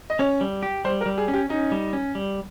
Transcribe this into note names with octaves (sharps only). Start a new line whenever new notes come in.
D#5
C#4 C#5
G3
G4
G3 C5
A#4
G3
G#4
C#4
G4
C#4 D#4
G3
C#4
G3